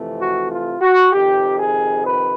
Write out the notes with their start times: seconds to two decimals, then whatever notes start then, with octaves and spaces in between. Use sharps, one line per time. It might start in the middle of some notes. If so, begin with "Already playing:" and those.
Already playing: F2 C3 E3 A3
0.20 F#4
0.50 F4
0.81 F#4
1.12 F2 C3 D#3 G4
1.59 G#4
2.05 B4